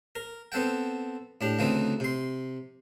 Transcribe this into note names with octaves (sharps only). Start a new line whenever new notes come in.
A#4
B3 C4 A4 F#5 G5
A2 D4 G4
D2 C#3 E3 A3 C4 D#4
C3 C6